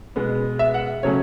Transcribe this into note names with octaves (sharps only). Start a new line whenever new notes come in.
B2 G#3 B3
E5
F#5
C#3 F#3 A3 C#4 C#5